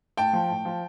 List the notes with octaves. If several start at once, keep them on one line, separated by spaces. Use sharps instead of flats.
A2 G5 A5
F3
A2
F3